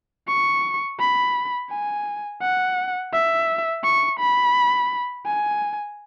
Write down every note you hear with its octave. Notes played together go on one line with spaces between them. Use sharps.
C#6
B5
G#5
F#5
E5
C#6
B5
G#5